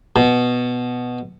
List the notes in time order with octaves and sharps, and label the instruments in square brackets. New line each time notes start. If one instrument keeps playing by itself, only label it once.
[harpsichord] B2